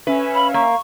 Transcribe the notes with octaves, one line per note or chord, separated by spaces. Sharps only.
C#4 B4 E5
F5 B5
A#3 C#6